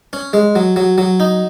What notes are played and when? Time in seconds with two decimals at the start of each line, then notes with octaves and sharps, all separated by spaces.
0.13 C#4
0.33 G#3
0.55 F#3
0.76 F#3
0.98 F#3
1.20 D#4